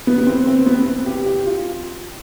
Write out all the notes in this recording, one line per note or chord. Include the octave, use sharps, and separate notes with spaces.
B3
B3
C4
C4
B3
C4
G4
G4
F4